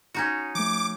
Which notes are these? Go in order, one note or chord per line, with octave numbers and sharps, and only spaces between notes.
C#4 D#4 F#4
F3 A3 D6